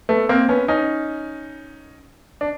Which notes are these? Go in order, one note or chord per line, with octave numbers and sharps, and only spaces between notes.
A3 B3
A#3 C4
B3 C#4
C#4 D#4
D4